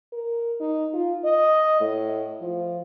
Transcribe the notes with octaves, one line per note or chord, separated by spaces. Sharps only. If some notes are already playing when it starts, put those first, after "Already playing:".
A#4
D#4
F4
D#5
A2
F3